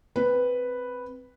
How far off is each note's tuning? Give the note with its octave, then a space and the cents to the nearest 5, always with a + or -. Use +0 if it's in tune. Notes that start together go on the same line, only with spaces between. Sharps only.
C4 +5 B4 +0